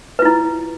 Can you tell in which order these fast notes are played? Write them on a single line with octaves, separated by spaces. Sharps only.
B4 F4 E4